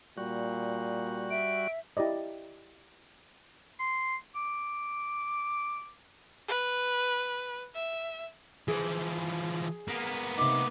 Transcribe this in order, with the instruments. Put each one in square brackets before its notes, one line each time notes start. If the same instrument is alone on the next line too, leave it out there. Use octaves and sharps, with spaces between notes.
[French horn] A#2 [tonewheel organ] G3 F#4
[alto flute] E5 [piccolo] D7
[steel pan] E4 G4 D5 D#5
[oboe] C6
D6
[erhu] B4
E5
[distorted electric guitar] E3 F3 [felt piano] G#4
[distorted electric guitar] A#3 B3
[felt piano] C3 D#4 [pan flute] D6